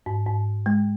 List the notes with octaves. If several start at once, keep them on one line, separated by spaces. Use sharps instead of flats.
G#2
G#2
G#3